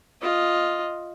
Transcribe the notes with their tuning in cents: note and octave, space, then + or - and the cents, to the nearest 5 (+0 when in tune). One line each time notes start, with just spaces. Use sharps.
F4 +0 D#5 +0